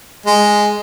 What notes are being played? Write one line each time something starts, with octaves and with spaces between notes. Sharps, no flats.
G#3